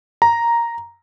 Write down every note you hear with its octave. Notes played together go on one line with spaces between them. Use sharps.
A#5